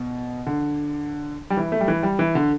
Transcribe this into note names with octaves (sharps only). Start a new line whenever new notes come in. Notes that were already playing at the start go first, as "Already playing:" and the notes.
Already playing: B2
D3
G3
E3
A3
G3
E3
G3
E3
D3